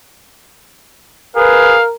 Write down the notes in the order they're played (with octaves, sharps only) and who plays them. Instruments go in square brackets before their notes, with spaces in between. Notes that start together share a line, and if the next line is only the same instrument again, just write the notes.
[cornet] G#4 [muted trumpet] A#4 [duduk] B4 [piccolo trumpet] F5